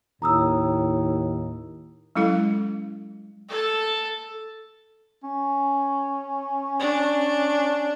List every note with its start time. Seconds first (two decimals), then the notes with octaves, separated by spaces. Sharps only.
0.22 D#2 A2 A#5 D#6 E6
2.16 F#3 G#3 C#4 E4 A4 F5
3.49 A4 A5
5.23 C#4
6.80 D4